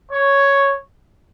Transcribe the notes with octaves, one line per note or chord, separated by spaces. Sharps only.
C#5